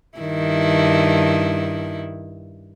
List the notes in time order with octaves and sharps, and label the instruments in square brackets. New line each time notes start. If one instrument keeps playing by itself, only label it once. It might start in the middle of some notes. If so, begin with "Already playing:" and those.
[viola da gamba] G2 D#3 E4